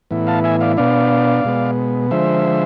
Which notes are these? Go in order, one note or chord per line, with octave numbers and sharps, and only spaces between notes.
A2 E3 B3 E4
F5 A5
E5 G#5
D5 F5
B2 B3 D4 D5 F5
B2 G#3 B3
D3 F3 G#3 C5 E5